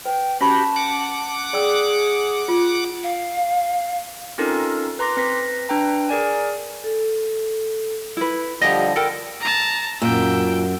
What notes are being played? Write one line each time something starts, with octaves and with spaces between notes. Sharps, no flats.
B4 G5
C#4 F#4 G4 A5 B5 C#6
F#5 D6
G#4 D5 G5 E6
F4
F5
C4 C#4 D#4 F4 A4 A#4
B4 A#5 C6 D6 A#6
C4 B4 A#6 B6
D4 B4 G5 A#5
G#4 A#4 D5 G#5
A4
E4 B4
D3 F3 G3 G4 C#5 D#5
G3 A4 A#4 G5
A5 A#5
F#2 A#2 G5 E6